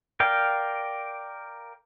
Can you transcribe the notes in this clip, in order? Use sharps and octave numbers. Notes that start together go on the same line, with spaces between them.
A#4 D5 F5 G5